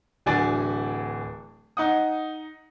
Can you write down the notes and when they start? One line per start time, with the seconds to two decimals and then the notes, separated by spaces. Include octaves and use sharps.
0.26 D1 E3 D4 F#4 G#5 A6
1.77 D#4 F#5 D#6